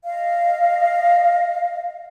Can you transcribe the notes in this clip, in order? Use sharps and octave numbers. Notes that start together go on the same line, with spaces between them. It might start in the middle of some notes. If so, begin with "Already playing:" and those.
D#5 F5